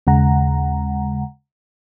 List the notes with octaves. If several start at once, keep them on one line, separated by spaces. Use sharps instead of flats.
D#2 C#3 G#3 F#5 A#5